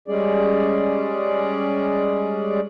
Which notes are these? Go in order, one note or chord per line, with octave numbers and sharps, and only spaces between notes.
G3 G#3 C#4 G#4 D5